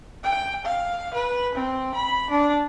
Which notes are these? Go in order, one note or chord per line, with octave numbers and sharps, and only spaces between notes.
G5
F5
B4
C4
B5
D4